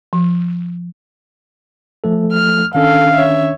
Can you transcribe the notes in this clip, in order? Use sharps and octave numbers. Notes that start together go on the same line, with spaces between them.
F3
F3 A3 A4
F6
D#3 C#4 D4 A4 F5
C#5 E5